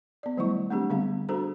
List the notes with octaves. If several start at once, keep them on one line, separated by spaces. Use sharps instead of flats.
B3 D5
D#3 F#3 G3 A3 E4 C#6
A3 C4 D4 G4 G#4
D3 G3 B3 C4 G#4 F5
D4 F#4 G#4 A4 C5 A#5